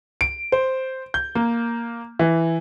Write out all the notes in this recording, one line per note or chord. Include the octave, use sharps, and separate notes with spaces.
D7
C5
G6
A#3
E3